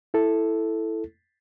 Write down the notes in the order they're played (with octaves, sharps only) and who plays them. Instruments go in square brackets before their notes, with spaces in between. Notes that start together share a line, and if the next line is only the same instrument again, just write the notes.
[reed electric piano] E4 A4